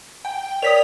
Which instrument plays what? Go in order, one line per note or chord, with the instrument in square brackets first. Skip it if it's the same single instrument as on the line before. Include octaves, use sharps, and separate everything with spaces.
[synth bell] G5
[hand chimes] A#4 C#5 D5 [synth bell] D#6 B6 F7